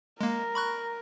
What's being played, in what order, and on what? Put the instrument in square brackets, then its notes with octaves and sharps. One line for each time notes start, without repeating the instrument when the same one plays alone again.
[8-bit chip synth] G#3 A#3 [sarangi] A#4
[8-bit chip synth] B5 C#6 F#6